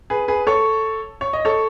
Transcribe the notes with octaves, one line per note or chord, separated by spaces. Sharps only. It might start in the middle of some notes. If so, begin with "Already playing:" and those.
G#4 B4
G#4 B4
A4 C#5
C#5
D#5
A4 C#5